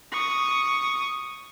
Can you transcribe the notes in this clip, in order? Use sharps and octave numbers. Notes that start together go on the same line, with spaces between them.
C#6 D#6